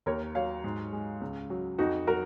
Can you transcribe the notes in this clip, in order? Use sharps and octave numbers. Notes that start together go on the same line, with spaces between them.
D#2 A#4 C#5
F#3 C#5 F5
G#2
G#3
C#2
F#3
F2 D#4 F#4
F#3 F#4 A#4